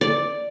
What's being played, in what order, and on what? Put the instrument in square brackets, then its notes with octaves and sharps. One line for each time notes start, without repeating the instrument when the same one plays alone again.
[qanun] D5